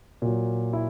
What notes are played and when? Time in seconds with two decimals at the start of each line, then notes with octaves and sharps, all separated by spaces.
0.22 A#2 F#3
0.73 E4